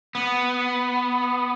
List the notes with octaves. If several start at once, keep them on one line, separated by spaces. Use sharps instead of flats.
B3